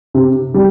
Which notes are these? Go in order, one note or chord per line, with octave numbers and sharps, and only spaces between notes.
C3
G3